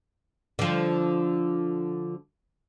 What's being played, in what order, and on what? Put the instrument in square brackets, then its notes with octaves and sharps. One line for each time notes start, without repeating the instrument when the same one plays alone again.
[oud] D3 F3